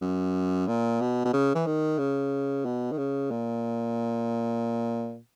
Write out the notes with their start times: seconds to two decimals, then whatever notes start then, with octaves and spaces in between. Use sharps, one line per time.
0.02 F#2
0.68 A#2
1.01 B2
1.25 B2
1.33 C#3
1.55 E3
1.66 D#3
1.99 C#3
2.65 B2
2.92 D#3
2.98 C#3
3.31 A#2